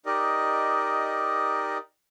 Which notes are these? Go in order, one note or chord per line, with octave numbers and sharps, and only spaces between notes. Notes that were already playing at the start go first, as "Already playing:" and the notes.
D#4 G4 A#4 D5 D#5